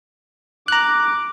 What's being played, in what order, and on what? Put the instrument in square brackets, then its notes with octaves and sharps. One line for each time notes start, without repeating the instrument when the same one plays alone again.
[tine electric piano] A#5 F#6 [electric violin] D6